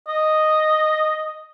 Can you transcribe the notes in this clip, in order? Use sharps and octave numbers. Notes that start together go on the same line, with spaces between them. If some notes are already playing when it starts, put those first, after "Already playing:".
D#5